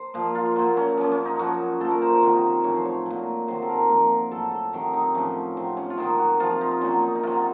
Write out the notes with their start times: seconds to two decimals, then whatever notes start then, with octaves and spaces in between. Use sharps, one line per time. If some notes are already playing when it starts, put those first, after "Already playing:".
Already playing: C5
0.14 A#2 F3
0.35 F4
0.56 A#2 F#3
0.77 C#4
0.98 F#2 F3 C#4
1.12 C#4
1.25 D#4
1.39 F#2 F3 F#4
1.81 A#2 F3 A4
1.91 A#4
2.02 C5
2.12 C5
2.23 C3 D#3 F#3
2.64 A2 F3 C#5
2.75 C5
2.85 C#5
3.06 A#2 F#3
3.48 C3 D#3 F#3 C5
3.62 A4
3.69 A#4
3.89 A#2 F3
4.31 A2 F#3 A4
4.52 A4
4.73 C3 D#3 F#3
4.93 D#4
5.15 A2 F3 C#4
5.57 C3 F#3 C4
5.77 C#4
5.90 F4
5.98 C3 D#3 F#3 D#4
6.19 F#4
6.40 C3 F3 F4
6.61 D#4
6.81 A#2 F#3 C#4
7.02 D#4
7.15 D#4
7.23 C3 F#3 F4